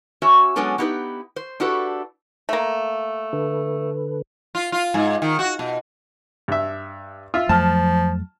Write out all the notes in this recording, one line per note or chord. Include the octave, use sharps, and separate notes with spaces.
C#4 F#4 C#5 E5
F#3 G#3 B3 C#4 D4 A4
B3 D#4 E4 G4 B4
C5
D4 E4 F#4 G4 A4 B4
A3 A#3
D3 A4 B4
F4
F4
G#2
D#3
F#4
B2
G2 E5
F4 E5
F2 F3 F#3 A3 A5 F6